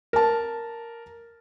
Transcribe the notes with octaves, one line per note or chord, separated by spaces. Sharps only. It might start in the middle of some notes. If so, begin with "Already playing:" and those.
A#4 A5